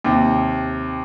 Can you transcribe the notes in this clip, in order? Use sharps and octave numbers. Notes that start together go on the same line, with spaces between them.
D#2 C3